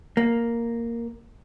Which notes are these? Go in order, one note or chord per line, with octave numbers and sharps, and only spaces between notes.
A#3